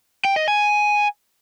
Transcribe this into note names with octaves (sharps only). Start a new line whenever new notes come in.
G5
D#5
G#5